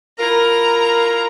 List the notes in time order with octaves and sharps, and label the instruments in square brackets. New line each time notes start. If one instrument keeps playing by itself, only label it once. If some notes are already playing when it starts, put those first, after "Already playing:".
[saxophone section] E4 F4 A#4 [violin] A#5